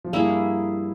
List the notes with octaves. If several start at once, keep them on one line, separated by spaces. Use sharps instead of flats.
F3
G2 G3 A#3 E4 G#4